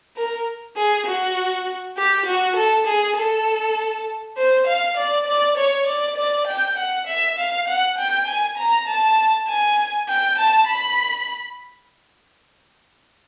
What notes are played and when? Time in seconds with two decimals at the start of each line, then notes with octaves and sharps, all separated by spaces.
0.16 A#4
0.77 G#4
1.07 F#4
1.97 G4
2.26 F#4
2.56 A4
2.87 G#4
3.17 A4
4.37 C5
4.67 F5
4.97 D5
5.27 D5
5.57 C#5
5.87 D5
6.17 D5
6.47 G5
6.77 F#5
7.07 E5
7.38 F5
7.68 F#5
7.97 G5
8.27 G#5
8.57 A#5
8.87 A5
9.48 G#5
10.09 G5
10.38 A5
10.67 B5